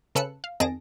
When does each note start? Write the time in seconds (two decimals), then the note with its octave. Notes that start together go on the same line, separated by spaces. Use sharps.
0.15 C#3 A4 B4 E6 F#6 C#7
0.44 F5
0.60 F2 D#3 G#4 A5 A#6 D7